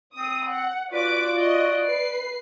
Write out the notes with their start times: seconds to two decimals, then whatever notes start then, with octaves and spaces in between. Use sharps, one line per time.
0.16 C4 D#6
0.48 F#5
0.92 F4 F#4 B4 D5 D6
1.37 D5 D#5
1.87 B4 C7